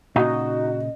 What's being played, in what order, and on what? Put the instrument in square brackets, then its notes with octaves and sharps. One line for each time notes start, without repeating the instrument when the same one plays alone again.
[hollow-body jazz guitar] A#2 C#3 [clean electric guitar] D#4 [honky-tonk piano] F#4 [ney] D#5